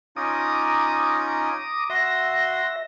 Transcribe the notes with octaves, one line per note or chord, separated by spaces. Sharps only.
C#4 D#4 F4 A#5 D6 D#6
F#4 E5 C6 A#6